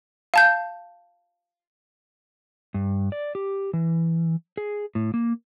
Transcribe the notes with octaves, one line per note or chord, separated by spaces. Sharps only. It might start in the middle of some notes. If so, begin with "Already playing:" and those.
F5 A5 G6
G2
D5
G4
E3
G#4
A2
A#3